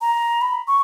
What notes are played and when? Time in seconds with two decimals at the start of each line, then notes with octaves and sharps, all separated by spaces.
0.01 A#5
0.41 B5
0.68 C#6